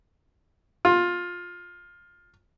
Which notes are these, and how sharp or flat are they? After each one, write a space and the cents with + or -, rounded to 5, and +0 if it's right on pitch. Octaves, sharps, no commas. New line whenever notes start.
F4 +15